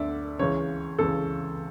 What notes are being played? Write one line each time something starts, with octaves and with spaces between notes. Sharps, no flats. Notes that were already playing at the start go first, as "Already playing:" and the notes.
Already playing: D2 D3 D5 E5
C#2 C#3 E3 C#5
C#2 C#3 E3 A4